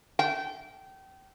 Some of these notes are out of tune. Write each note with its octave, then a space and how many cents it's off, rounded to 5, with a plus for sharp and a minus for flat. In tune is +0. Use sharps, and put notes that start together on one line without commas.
G5 -25